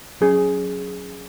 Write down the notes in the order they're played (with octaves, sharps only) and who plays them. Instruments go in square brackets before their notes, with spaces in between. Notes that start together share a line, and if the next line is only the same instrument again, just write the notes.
[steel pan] F#3 C#4 G#4